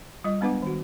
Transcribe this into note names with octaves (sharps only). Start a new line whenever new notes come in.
G3 F4 D#5
G#3 B3 D4 B4 F#5 D6
D#3 F#4